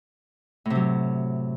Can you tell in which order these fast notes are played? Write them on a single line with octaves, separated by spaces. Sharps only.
A2 C3 F#3